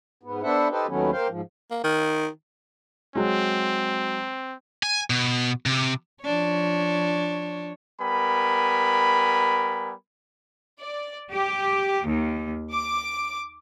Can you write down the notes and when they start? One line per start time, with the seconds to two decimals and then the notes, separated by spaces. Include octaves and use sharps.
0.23 G#2 B3
0.43 B3 D4 A4 C5 E5 F#5
0.70 D#4 G4 A4 B4 C5
0.88 D#2 D#3 F#3 A3 B3 C#4
1.12 A#3 C5 F5 G5
1.29 G#2 F3
1.70 A#3
1.84 D#3
3.15 F#3 G#3 C4
4.83 G#5
5.10 B2
5.66 C3
6.23 F3 D4 C#5
8.01 G3 B3 A#4 G#5 B5
10.80 D5
11.32 G4
12.07 D#2
12.72 D6